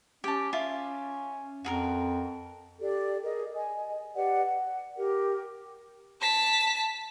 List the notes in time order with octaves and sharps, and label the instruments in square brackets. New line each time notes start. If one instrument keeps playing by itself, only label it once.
[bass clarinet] C#4 [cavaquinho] G4 A5
[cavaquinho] F4 E5
[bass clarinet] F2 [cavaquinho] F#4 G#4 A#4
[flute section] G4 A4 D5
G#4 A#4 D#5
D#5 G#5
G4 B4 D5 F#5
F#5
G4 A#4
[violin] A5 B6